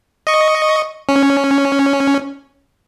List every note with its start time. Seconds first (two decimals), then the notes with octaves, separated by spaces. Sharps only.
0.27 D#5 C#6
1.09 C#4